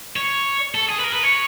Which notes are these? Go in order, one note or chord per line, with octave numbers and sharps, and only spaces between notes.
C#5
A4
G#4
B4
A#4
B4
C#5